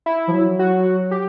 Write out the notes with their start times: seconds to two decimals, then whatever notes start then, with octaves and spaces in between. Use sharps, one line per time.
0.06 E4
0.28 F3
0.32 F#3
0.59 F#4
1.11 G4